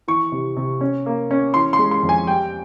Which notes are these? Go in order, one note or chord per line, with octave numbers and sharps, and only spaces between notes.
E3 C#6
C3
C3
C#4
A#3
C#4
E3 C6
C6
G#3
C6
F2
G#5
G3 G5